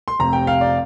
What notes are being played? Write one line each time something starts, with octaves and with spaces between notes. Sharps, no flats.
C6
F1 F2 C3 A#5
G5
F5
D5